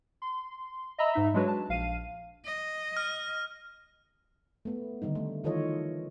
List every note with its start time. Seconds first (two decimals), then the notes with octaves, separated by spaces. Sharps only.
0.22 C6
0.98 D#5 E5 A#5 B5 E6
1.13 G#2 D#4 E5
1.34 F#3 G#3 D4 F#4 B4 C#5
1.48 A5
1.69 A#1 F5 D#7
2.45 D#5
2.97 F6
4.65 A3 B3
5.02 D3 D#3 G3 D#4
5.15 A3
5.44 D#3 E3 F4 A4 C#5 D#5